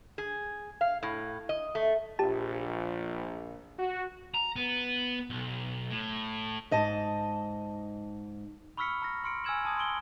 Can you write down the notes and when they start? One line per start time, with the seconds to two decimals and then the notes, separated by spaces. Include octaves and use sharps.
0.18 G#4
0.81 F5
1.03 A2
1.49 D#5
1.75 A3
2.19 A#1 G4 A5
3.79 F#4
4.34 A#5
4.56 B3
5.30 B1
5.90 A2
6.71 G#2 D#5 A5
8.77 B5 C#6 E6 F6 B6 C#7
9.02 A#5 F6 A#6
9.24 C6 F6 C#7 D7
9.44 G#5 E6 F6 G#6 E7 F#7
9.65 A5 D#6 G#6
9.77 C6 E6 D7 G7